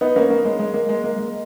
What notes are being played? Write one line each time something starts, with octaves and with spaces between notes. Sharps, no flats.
B3 D#4
A#3 C#4
A#3
G#3
G#3
A#3
G#3
A#3
G#3